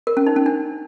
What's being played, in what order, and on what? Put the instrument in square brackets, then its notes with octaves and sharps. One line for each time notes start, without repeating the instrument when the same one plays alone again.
[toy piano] A#4
C#4
D#4
C#4
D4